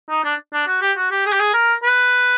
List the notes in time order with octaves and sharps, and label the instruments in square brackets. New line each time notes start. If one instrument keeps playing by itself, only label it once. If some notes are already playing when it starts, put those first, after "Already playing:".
[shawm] D#4
D4
D4
F#4
G4
F#4
G4
G#4
G4
G#4
A#4
B4